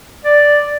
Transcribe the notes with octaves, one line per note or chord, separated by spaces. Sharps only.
D5